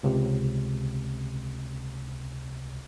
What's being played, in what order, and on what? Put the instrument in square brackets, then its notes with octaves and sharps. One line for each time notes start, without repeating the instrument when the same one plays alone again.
[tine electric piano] C#2 C3